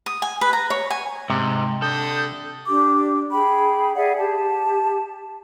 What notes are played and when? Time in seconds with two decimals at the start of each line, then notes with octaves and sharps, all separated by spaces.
0.06 D#6
0.22 G#5
0.41 B4
0.53 A#5
0.70 C#5
0.90 G#5
1.30 G#2 C3
1.82 D3 A4 D#6 G6
2.67 D4 G4 D6
3.32 G#4 G5 B5
3.96 G#4 D5 E5 F#5
4.18 G4 A5